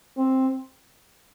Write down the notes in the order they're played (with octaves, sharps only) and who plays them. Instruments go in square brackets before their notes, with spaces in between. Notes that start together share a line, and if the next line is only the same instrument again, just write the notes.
[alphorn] C4